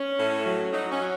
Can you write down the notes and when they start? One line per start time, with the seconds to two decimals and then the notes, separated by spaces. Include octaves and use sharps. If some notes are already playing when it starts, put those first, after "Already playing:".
Already playing: C#4
0.18 A2
0.45 F#3
0.72 F#3 D#4
0.90 C#4
0.99 F#3